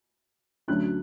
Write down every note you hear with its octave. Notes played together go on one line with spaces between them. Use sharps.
D2 D3 F#3 C#4 F#6